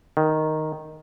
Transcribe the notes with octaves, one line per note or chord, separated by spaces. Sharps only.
D#3